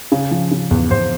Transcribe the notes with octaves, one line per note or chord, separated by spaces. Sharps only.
C#3
F3
C#3
E2
E2 C5